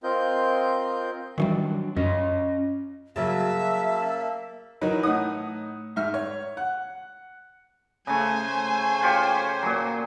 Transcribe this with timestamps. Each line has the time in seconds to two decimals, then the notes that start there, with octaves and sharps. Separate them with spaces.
0.03 C4 F4 A#4 D#5 G6
1.38 D#3 E3 F#3 G3 D4
1.97 F#2 C#4 F4 D#5
3.16 C#3 F#3 A#3 E5 A5
4.81 E3 F#3 D#4 A#4 B4
5.03 A2 D#4 F#5 D#6
5.96 G#2 E5 F6
6.14 C#5
6.57 F#5
8.07 C#3 A3 C5 G#5
9.02 F4 G4 C#5
9.62 A#2 F#3